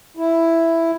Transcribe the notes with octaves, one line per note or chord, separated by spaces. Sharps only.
E4